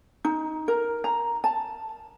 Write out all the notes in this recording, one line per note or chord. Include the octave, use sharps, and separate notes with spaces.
D#4
A#4
A#5
A5